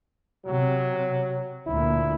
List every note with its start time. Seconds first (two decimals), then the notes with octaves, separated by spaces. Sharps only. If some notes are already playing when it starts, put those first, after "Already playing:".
0.46 C3 F#3
1.67 D2 A#2 E4